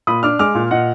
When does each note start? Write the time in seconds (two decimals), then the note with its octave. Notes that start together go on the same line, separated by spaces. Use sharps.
0.07 A#2 B5 D#6
0.23 D4 D6 F6
0.39 G#3 D6 F6
0.55 A#2
0.71 A#2 D#5 F#5